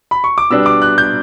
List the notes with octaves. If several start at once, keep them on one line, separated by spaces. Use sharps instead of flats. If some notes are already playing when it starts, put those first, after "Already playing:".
B5
C#6
D6
B2 G3 B3 D4 E6
D6
F#6
G6